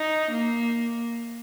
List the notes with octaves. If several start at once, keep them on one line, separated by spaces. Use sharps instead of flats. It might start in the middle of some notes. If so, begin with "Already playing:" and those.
Already playing: D#4
A#3